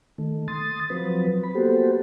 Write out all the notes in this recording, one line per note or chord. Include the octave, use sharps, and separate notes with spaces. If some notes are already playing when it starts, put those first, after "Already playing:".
D#3 A3
C6 D#6 A6
F3 F#3 C4 B4
B5
A#3 B3 F#4 G4 A4 C5